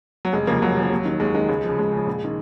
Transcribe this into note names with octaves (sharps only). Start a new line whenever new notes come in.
F#3
F1 G#3
D#2 C#3 F3 A#3
F1 F#3
D#2 C#3 F3
D#2
D#3
D#2 G#3
D#3 G#3
C#2
C#3 F3
C#2 G#3
C#3 F3
A#1
D#3